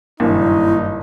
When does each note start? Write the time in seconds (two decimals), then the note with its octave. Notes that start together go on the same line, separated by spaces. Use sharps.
0.20 F#1 G2 A#2 D#3 D#4 E4